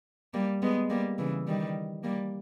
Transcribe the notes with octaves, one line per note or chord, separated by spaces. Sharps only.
G3 A#3
G#3 B3
G3 A#3
C#3 E3
D#3 G3
G3 A#3